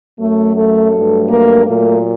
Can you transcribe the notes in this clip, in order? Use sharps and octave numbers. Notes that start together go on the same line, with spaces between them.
F#2 F#3 A3
A3 A4
G2 F#3 A3
A#3 A#4
A#2 F#3 A3 A#3 A#4